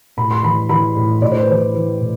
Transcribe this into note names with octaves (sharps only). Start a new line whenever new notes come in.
A2 B5
C6
E3 B5
E3 B5
A2
A2 D5
C5
B4
E3 C5
E3 B4
A2